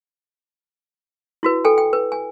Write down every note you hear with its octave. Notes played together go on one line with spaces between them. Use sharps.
E4 F#4 B4
A4 G5 G#5
G5
B4
G#5